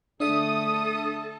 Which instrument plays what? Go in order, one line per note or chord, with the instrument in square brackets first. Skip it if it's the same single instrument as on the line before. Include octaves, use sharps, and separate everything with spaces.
[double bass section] D3 A3 [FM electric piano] D4 E5 [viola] A4 [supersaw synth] D#6